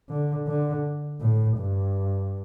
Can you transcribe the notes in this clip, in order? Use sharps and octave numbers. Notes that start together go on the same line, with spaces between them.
D3
D3
A2
G2